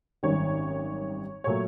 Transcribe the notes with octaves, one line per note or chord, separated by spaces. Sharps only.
G#1 F#2 D#3 G3 C#5
A#2 F#3 A3 C#5